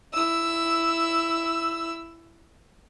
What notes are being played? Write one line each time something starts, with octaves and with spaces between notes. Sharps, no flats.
E4 E6